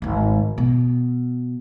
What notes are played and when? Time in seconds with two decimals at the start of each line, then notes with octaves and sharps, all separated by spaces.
0.02 G#1 D2
0.58 B2